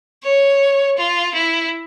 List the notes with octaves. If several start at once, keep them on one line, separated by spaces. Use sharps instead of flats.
C#5
F4
E4